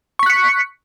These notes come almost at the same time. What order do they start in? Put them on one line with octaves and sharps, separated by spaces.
C#6 B6 F#6 C#7